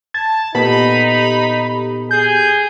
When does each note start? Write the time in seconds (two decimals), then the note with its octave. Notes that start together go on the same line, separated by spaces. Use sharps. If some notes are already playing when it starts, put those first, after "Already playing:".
0.14 A5 G#6
0.55 A#2 B3 D#4 G4 A4 B5
2.11 G#4 G6